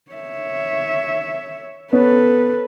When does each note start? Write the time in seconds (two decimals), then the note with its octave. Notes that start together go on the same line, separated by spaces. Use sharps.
0.11 C#5 E5
1.93 B3 C#4 A4 B4